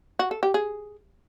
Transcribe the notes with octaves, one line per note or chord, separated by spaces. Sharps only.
F#4
A4
G4
G#4